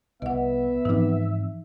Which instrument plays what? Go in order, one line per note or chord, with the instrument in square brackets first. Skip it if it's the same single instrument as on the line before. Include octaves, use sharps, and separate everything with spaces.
[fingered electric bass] C2 [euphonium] B3 [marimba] D#5 F#5 [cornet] E5
[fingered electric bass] G#2 C4 [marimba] E3 F3 D#4